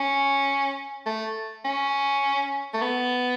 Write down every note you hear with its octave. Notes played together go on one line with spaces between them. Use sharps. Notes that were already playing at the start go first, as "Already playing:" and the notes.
Already playing: C#4
A3
C#4
A3
B3